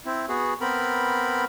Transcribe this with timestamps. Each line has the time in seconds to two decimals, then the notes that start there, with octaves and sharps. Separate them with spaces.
0.06 C4 E4
0.29 B3 F#4 G#4
0.61 B3 C4 A#4 B5